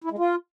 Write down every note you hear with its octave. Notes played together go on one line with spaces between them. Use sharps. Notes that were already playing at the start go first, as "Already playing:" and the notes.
E4
G#3
F4